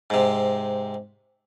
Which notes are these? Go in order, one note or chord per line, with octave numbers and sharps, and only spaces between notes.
G#2 C3